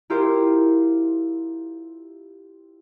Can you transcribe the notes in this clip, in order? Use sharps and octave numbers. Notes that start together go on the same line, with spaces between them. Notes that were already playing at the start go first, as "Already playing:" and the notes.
E4 F4 G4 A#4 C5